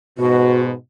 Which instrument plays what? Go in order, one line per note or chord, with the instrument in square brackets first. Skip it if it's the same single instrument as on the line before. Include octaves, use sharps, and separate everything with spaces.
[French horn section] G#2 B2 [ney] F#4